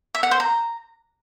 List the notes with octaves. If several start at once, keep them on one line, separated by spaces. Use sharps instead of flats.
E5
F#5
C5
A#5